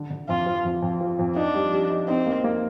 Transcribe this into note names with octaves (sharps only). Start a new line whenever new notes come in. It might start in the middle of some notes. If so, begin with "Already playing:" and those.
Already playing: D3
D3
F2 F4
F3
F2
F2
F3
F2
D4 D#4
G3
G3
D#4
C4 D#4
A#3
A#3